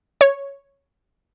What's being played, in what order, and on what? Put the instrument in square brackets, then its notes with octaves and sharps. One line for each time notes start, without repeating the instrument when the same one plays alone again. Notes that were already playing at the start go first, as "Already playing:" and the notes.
[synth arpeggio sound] C#5